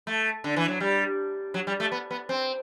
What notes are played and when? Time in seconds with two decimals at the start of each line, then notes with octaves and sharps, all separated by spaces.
0.07 A3
0.44 D3
0.56 E3
0.68 F#3
0.80 G3
1.54 F#3
1.67 G3
1.80 A3
1.92 B3
2.11 B3
2.29 C4